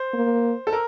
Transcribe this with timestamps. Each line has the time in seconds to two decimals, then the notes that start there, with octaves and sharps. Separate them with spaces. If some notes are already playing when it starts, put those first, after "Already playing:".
Already playing: C5
0.14 A#3
0.67 A4
0.72 A#4